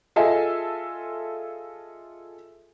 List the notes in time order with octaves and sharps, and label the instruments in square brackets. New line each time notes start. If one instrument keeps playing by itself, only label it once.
[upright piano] F4 G#4 A4 D#5 E5 G#5